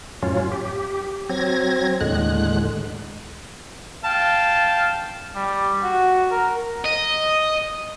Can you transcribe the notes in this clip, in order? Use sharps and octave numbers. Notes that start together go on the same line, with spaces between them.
F#2 A2 F#3 C#4 F4
G4
F#3 C4 G#6 A#6
D#2 A2 D3 G#3 F#6
F5 G5 A5
G3
F#4
A#4
D#5